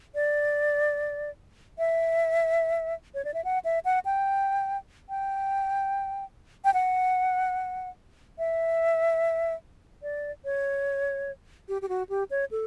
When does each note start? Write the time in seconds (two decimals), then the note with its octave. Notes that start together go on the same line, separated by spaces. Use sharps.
0.15 D5
1.79 E5
3.15 C#5
3.25 D5
3.34 E5
3.44 F#5
3.65 E5
3.85 F#5
4.05 G5
5.09 G5
6.65 G5
6.74 F#5
8.39 E5
10.03 D5
10.45 C#5
11.69 G4
11.82 G4
11.89 F#4
12.09 G4
12.31 C#5
12.51 A4